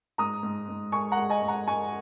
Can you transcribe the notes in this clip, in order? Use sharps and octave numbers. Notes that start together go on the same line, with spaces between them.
G#2 A#5 D#6
G#2
G#2
G#3 G#5 C#6
F#5 A#5
G#3
D#5 G#5
G#2
F#5 A#5
G#2 G#5 C#6